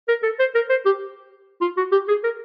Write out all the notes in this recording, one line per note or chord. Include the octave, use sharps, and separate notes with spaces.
A#4
A4
C5
A#4
C5
G4
F4
F#4
G4
G#4
A#4